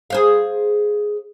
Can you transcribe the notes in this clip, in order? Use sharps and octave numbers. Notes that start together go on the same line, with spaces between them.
G#4 C5 F5